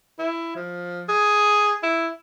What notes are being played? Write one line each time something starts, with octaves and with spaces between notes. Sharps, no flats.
E4
F3
G#4
E4